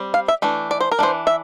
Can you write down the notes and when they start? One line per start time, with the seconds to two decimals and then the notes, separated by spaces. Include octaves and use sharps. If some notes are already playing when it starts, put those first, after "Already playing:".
Already playing: G3 C4
0.14 F5
0.28 E5
0.42 E3 A3 D4
0.71 D5
0.80 C5
0.92 A#4
0.99 E3 A3 D4 C5
1.27 E5